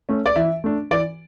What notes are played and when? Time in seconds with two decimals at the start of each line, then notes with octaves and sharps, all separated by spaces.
0.09 A3 C#4
0.26 D5
0.36 E3 E5
0.64 A3 D4
0.91 E3 D5